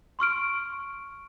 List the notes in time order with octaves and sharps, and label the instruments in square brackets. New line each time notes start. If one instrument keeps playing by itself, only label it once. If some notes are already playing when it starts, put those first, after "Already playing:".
[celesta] C6 C#6 F6 D7